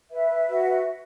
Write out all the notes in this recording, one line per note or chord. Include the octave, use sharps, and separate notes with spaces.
B4 E5
F#4